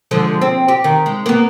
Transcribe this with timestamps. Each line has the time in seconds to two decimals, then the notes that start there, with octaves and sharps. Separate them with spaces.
0.11 D3 F3 G#3
0.41 C4
0.68 G4
0.84 D#3
1.06 G#3
1.26 A#3 B3